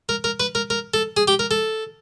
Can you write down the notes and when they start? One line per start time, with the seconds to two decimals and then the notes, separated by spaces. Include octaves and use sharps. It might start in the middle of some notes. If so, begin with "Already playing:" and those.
0.09 A#4
0.24 A#4
0.40 B4
0.55 A#4
0.70 A#4
0.94 A4
1.17 G#4
1.28 G4
1.39 A#4
1.51 A4